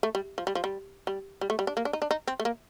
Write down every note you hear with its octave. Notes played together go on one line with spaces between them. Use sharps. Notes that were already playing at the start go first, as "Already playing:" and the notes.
A3
G3
F3
G3
F3
G3
G3
G3
A3
G3
D4
A#3
D4
D#4
D4
D#4
C4
A3
A#3